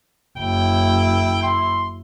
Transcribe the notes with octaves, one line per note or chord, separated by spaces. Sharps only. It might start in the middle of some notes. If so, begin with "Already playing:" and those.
F#1 E4 G5
C6